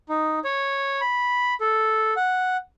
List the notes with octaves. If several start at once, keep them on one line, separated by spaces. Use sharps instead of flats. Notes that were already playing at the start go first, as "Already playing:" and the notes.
D#4
C#5
B5
A4
F#5